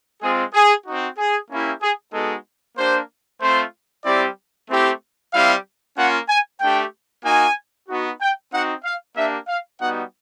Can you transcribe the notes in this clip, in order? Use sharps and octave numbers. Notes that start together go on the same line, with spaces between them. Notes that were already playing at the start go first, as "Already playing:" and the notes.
G#3 C4 F4 G#4
G#4
C4 D#4 F#4
G#4
A#3 C#4 E4 G4
G#4
G#3 B3 D#4 F#4 A4
A#3 D4 G4 C5
A3 C4 F4 C5
G3 C4 E4 G4 D5
A3 C4 E4 G4
G3 C4 E4 G4 F5
A#3 C#4 F4 F#5
G#5
A3 D4 G4 G5
A#3 D#4 F#4 G#5
B3 D#4 F#4
G5
C4 D#4 F#4 F#5
F5
A#3 D4 G4 E5
F5
G3 B3 D#4 F#4 F#5